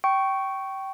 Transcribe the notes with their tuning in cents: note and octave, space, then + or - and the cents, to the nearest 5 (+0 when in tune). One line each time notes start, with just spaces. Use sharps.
G5 -20 C#6 +0